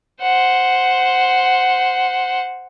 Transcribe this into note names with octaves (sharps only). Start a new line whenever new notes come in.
C5 F#5